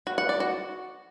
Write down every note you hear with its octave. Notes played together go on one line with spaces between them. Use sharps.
F#4
F#5
D5
F#4